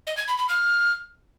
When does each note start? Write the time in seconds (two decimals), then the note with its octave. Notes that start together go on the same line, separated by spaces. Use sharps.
0.07 D#5
0.17 G#6
0.28 B5
0.38 B5
0.49 F6